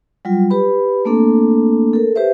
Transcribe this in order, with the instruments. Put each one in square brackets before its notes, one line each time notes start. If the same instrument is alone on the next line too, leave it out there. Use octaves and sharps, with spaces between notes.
[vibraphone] F#3 G3 F4
G4 B4 B5
A3 A#3 C4 D4 A4
A4 A#4
G4 B4 C5 E5